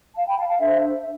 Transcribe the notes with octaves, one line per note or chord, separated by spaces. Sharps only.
F5 A5
G5 B5
F5 A5
F5 A5
D4 A4 C5 E5
E5